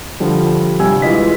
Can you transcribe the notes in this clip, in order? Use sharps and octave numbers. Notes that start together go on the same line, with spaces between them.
D3 F3 G3
G1 C3 G3 G#5 E6
E3 G#3 F4 D#5 B6